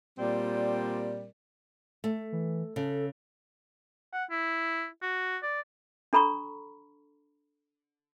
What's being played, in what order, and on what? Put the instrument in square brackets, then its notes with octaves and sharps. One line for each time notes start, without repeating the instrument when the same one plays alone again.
[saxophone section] A#2 G3 C4 A#4 D5
[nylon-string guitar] A3
[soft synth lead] E3
[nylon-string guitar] C#3 [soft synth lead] A4
[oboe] F#5
E4
F#4
D5
[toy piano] D4 A4 A#5 B5 C#6